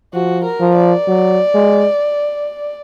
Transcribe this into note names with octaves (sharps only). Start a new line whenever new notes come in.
F3 F#4
A#4
F3
D5
F#3
G#3